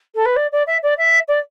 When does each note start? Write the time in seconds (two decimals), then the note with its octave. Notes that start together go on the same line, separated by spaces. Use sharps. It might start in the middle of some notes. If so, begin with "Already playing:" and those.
0.15 A4
0.25 B4
0.36 D5
0.52 D5
0.67 E5
0.83 D5
0.97 E5
1.28 D5